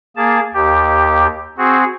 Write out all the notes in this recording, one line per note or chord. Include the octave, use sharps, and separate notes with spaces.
A#3 G#4 A5
D#2 G4
C4 F#4 G#4